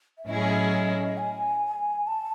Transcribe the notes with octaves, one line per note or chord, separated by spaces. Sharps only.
E5
A2 F#3 C#4 E4 G#4 D#5
G#5
A5